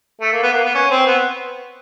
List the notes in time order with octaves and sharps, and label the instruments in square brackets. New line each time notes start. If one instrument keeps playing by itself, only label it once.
[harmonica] A3
A#3
B3
A#3
B3
C#4
C4
B3